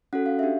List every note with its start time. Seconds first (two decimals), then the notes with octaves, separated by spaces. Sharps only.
0.13 C#4 F#4 A4 F#5
0.26 F5
0.39 D4 G4 E5